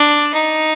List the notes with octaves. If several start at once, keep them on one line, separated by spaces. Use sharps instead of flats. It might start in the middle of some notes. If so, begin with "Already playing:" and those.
Already playing: D4
D#4